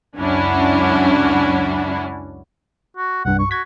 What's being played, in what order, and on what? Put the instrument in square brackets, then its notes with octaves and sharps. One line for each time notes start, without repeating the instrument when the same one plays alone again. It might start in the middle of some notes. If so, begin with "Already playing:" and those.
[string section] C#2 F#2 C#4 D4 E4 F#4
[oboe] F#4
[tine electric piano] C2 G2 [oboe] F#5
[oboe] C#6
[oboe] F#4 [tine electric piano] G#6 B6